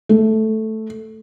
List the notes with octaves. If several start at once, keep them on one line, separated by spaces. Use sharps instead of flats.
A3